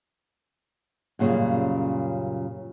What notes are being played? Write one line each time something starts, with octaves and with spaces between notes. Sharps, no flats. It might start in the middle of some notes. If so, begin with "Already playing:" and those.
F#2 A#2 C#3 G3